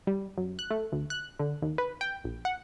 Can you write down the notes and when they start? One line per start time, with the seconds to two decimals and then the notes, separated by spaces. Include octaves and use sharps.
0.07 G3
0.38 F#2
0.59 F#6
0.71 A3
0.92 D2
1.10 F#6
1.39 D3
1.62 D#2
1.78 B4
2.01 G5
2.24 A#1
2.45 F#5